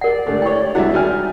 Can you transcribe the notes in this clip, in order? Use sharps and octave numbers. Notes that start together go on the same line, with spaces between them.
G4 A#4 D5 F#5
G#2 D3 A3
E4 C#5 G5 C#6
C2 G#3 D4 E4 F#4 E5 F#5
D#3 G5 G#5 F6